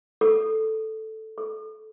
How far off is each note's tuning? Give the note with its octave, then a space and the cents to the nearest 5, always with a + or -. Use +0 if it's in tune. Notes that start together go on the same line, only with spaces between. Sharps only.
A4 +0
A4 -20